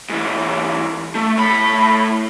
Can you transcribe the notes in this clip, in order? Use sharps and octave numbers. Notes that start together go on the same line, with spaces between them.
G#2 E3
A3
A2 B5